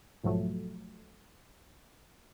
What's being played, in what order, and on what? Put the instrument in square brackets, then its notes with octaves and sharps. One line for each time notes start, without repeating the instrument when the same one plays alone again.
[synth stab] B1 G#2 F3 F#3 A3